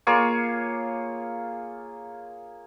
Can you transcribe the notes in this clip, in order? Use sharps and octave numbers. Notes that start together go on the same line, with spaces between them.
A#3 F4 G#4 C#5